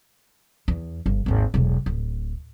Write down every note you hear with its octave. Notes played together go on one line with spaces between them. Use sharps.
E2
G1
G#1 D#2
E1 B1
D1